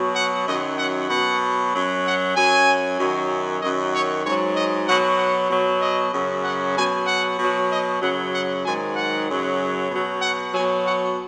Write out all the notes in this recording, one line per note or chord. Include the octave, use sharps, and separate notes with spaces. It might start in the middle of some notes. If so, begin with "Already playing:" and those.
Already playing: B2 F#3
F#5
F#2 D#3 F#3 D#5
F#5
B2 F#3 F#5
F#2 F#3
F#5
F#2 F#3 G#5
F#2 D#3 F#3
F#2 D#3 F#3 D#5
C#5
G#2 F#3 C#5
D#5
B2 F#3 F#5
F#5
B2 F#3
D#5
F#2 C#3 F#3
F#5
B2 F#3 G#5
F#5
B2 F#3
D#5
F#2 C#3 F#3 F#5
F#5
G#2 D#3 F#3 G#5
F#5
F#2 C#3 F#3
B2 F#3
F#5
B2 F#3 G#5
F#5